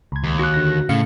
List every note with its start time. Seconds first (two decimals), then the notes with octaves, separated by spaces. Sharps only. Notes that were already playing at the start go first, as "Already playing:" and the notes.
0.12 C#2 G#6
0.24 D#2
0.39 F#4 F#6
0.54 D3 A#6
0.89 A2 C#3 F5 C#7